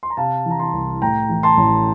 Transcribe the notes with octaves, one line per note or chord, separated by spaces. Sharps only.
C6
A#5
C3 F5 A5
E3
A#5
A5 C6
C2
A2 G5 A#5
E3
A5 C6
A1